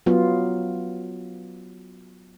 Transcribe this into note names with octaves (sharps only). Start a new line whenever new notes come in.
F#3 B3 F4